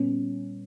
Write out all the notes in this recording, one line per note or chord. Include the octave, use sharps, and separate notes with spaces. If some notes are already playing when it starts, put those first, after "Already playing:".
Already playing: A#2 G3 B3 C#4